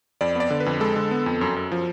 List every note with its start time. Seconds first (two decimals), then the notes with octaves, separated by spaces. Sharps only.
0.21 F2 D5
0.35 B3 D5
0.50 D3
0.60 B4
0.66 F2
0.80 G#3 A4
0.96 D3
1.11 B3
1.26 F2
1.41 F#2
1.56 F#2
1.72 F3